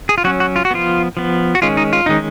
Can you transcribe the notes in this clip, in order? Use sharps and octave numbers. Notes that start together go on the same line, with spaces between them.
G#4
F4
F#3 C#4 F#4
F#4
F4
F#4
F3 B3 F4
F3 B3
F#4
D#3 G#3 C#4 F4
D#4
F4
D#3 G#3 C#4 D#4